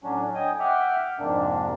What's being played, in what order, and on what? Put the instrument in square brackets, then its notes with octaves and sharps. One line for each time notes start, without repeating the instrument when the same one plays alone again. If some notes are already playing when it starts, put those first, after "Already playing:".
[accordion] A2 F#3 C#4 D4
D#5 G5 G#5 D#6
E5 F#5 G5 D6 F6
F2 G#2 C3 A#3 D4